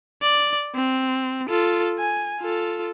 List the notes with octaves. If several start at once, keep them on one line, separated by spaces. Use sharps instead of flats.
D5
C4
F4 A4
G#5
F4 A4